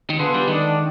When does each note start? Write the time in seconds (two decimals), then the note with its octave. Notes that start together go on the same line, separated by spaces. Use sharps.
0.10 D#3
0.19 D3 B3 F4 G#4 B4
0.34 G3
0.47 D3 D#3 G#3 D4